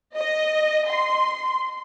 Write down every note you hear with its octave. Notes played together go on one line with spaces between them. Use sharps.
D#5
C6